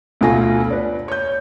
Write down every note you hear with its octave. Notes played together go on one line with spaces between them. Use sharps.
D2 B2 A3 F4 G#5 A#6
B4 D5
C#5 G6